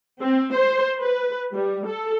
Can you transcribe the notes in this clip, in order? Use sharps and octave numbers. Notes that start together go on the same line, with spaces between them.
C4
C5
B4
G3
A4